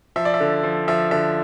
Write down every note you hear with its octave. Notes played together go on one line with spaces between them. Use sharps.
F3 E5
D5
E5
D3
F3
F3 E5
D3 E5